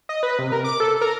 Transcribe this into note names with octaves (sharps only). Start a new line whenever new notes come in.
D#5
B4
C3
A#4
D6
A4
A#4